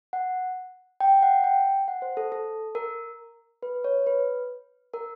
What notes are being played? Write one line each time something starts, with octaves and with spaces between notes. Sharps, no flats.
F#5
G5
F#5
G5
F#5
C5
A4
A4
A#4
B4
C#5
B4
A#4